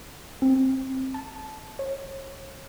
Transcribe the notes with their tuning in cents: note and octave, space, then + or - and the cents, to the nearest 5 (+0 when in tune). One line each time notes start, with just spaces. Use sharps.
C4 +15
A5 -20
C#5 -35